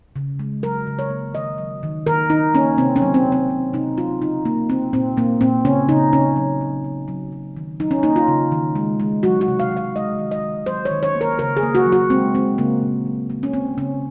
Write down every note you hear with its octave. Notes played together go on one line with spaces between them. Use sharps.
C#3
G#3
F#3 A#4
C#3
C#5
A#3
D#3 D#5
F#3
D#3
D#3 A#4
D#3 D#4
A#3 C#4
C3 C4
C#4
F#3
C4
C3
C4
C3
C3 D#4
F#3 F4
C#3 D#4
A#3
A#3 C4
A#2 C4
A#2 A#3
A#2 C4
C#3 C#4
C#3 D#4
C#3 C#4
F#3
F#3
F#3
F#3
F#3
D#3
F#3 D#4
C#4
A#3 D#4
F4
C#3
D#3
G#3
G#3
F#3 F#4
F#4
C3
F5
F#3
F5
G#3 D#5
D#3
D#5
D#3
F#3 C5
C#5
D#3
C#5
A#3
A#4
C#3 A#4
G#4
A#3
F#4
F#3
F#4
G#3 C4
G#3 C4
C#3 A#3
A#2
F#3
A#3
C#4
A#3 C4
C#3 C#4